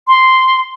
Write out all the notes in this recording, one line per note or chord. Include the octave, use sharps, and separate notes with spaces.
C6